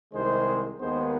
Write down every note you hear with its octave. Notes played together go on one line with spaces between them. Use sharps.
C2 C3 D#3 G#3 C5
D#2 D#3 G#3 B3 C5